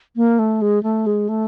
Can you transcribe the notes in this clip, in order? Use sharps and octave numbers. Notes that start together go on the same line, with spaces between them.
A#3
A3
G#3
A3
G#3
A3